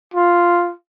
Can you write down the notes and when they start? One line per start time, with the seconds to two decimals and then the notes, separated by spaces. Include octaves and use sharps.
0.14 F4